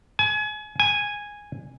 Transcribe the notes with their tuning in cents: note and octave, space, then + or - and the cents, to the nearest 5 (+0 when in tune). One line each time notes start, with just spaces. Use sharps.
G#5 +35
G#5 -5